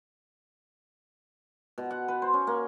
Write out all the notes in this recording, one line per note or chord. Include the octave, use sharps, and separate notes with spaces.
B2
F#5
B4
C5
C#4
A#3